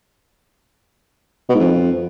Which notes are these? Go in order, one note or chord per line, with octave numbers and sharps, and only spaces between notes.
B2
G#2
F2